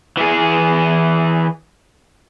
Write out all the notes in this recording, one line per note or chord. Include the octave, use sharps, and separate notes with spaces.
E3 G#4